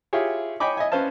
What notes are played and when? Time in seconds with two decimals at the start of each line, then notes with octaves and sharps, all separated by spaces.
0.13 E4 F4 G4 G#4 C#5
0.60 C#5 D#5 G5 G#5 B5 D6
0.77 D#5 E5 G#5
0.92 C#4 B4 C5 F5 A5